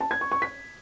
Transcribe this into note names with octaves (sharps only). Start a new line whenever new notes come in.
A5
G#6
C#6
C#6
B6